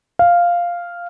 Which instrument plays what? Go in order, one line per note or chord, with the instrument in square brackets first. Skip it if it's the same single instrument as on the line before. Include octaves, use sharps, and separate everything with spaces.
[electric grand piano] F5